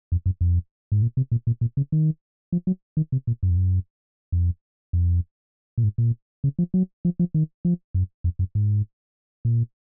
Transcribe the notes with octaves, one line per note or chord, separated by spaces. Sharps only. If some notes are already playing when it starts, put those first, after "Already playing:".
F2
F#2
F2
G#2
A#2
C3
A#2
A#2
A#2
C#3
D#3
F3
F#3
D#3
C3
A#2
F#2
F2
F#2
F2
F2
A#2
G#2
A#2
C#3
F3
F#3
F3
F3
D#3
F3
F#2
F2
F#2
G#2
A#2